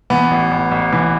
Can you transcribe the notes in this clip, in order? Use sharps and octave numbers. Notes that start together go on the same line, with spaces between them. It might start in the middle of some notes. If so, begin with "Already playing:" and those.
E3 B3
A1
A1
A1
E3